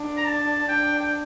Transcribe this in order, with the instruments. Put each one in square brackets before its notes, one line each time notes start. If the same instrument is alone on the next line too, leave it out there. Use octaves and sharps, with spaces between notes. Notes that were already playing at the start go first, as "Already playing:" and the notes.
Already playing: [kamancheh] D4
[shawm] A#5
A5
[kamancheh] D4 [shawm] G5
[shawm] G5